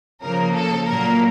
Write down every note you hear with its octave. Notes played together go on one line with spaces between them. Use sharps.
C#3 F3 A#3 A#4
A4
A#2 F#3 A#3 A#4